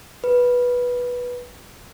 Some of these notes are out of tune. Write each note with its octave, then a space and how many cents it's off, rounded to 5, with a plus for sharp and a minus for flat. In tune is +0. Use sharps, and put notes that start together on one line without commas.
B4 -10